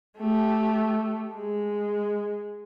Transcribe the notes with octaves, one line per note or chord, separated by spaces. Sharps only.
A3 G4
G#3